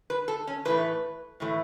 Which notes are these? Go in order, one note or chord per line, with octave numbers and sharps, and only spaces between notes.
B4
A4
C#4
A2 E3 A3 B4
A2 E3 A3